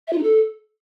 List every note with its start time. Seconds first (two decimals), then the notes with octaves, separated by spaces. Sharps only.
0.08 E5
0.13 F4
0.18 D#4
0.23 A4